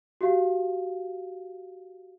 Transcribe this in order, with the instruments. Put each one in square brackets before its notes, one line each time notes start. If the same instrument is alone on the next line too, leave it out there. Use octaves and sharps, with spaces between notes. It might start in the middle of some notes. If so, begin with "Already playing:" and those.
[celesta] F#4 G4 F5